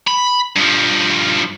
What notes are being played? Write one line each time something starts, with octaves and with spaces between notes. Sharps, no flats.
B5
G2 F3